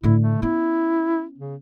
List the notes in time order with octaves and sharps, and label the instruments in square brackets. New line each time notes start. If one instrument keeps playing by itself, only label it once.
[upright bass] A2 D3 [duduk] E4
[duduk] A3
[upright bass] B3 C#4 [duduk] E4
[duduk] C#3